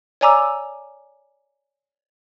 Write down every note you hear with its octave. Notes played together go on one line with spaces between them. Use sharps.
C#5 D5 G#5 A#5 D6 E6